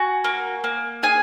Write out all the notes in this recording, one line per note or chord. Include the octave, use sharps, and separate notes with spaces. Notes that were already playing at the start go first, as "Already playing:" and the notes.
Already playing: F#4 G#5
A#3
A#3
G#4 G#5